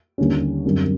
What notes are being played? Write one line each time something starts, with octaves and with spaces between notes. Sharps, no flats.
D#2 D3 G3 A#3 C#4
F#2 D3 G3 C4